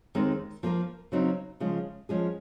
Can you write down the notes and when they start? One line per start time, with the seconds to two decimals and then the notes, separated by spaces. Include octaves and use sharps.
0.15 D#2 D#3 G#3 C4
0.63 F3 A#3 F4 A#4
1.12 C#3 F#3 C4 D#4
1.60 C#3 F3 G#3
2.09 F3 G#3 C#4 G#4